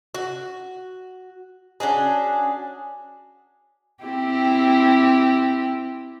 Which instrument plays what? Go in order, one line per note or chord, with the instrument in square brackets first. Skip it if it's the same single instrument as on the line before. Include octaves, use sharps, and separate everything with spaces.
[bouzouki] F#4
C#4 D4 F#4 G#4
[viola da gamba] C4 E4 G4